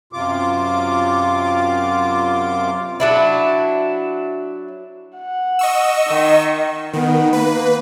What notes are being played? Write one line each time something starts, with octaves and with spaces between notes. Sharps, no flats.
F#2 C3 F4 D6
F#3 D4 E4
F#5
D#5 C#6 E6
D#3
D#3 B3
A#3 B4